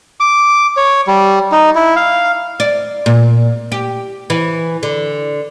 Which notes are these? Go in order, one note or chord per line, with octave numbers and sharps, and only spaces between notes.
D6
C#5
G3
D#4
E4
F5
D5
A#2
G4
E3
D3